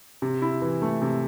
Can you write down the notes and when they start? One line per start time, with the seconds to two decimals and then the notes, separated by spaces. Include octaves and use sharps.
0.22 C3
0.42 E4
0.62 E3
0.82 A3
1.02 C3